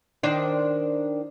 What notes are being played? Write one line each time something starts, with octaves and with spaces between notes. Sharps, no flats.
D#3 D4 C5